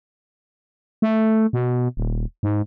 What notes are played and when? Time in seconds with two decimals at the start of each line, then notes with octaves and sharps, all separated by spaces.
1.02 A3
1.53 B2
1.97 D#1
2.43 G#2